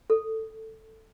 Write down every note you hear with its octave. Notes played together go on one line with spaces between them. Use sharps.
A4